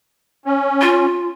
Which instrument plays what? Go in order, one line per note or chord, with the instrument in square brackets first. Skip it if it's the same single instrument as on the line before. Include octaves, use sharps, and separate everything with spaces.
[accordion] C#4
[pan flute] F4